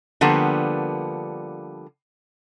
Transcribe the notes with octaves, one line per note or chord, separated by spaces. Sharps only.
D3 F3 G3 A#3 B3